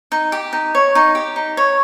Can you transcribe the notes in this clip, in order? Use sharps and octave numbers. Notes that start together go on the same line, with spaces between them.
D#4
G4
D#4
C#5
D#4
G4
D#4
C#5